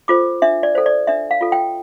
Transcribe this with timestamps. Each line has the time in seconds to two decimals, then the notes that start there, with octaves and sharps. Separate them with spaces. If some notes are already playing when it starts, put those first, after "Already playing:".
0.08 F4 A4 C5 D6
0.42 D4 E5
0.63 D5
0.75 A4 C5
0.86 D5
1.07 D4 E5
1.31 F5
1.41 F4 A4
1.52 G5